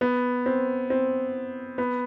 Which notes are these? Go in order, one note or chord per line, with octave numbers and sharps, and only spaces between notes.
B3
C4
C4
B3